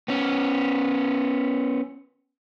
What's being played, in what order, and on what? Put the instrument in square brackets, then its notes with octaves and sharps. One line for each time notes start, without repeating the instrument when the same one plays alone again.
[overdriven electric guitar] B3 C#4